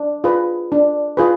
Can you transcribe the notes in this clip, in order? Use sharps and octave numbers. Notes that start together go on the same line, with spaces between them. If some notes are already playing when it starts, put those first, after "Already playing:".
Already playing: D4
F4 G#4 B4
D4
F4 G#4 B4